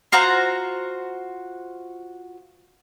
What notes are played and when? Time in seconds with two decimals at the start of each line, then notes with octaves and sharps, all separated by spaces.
0.12 F4 F#4 C5 A#5